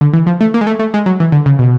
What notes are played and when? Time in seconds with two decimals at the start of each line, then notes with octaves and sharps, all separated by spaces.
0.01 D3
0.13 E3
0.27 F3
0.41 A3
0.54 A#3
0.61 G#3
0.67 A3
0.79 A3
0.94 G#3
1.06 F#3
1.20 E3
1.32 D3
1.46 C#3
1.59 B2